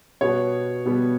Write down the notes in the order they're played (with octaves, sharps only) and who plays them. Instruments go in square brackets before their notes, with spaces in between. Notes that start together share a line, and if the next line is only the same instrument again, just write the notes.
[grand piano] B2 G3 B3 C#5
B2 G3 B3